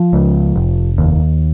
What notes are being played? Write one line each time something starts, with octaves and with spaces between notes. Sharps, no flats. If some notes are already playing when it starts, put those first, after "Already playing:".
Already playing: F3
C#2
F1
D#2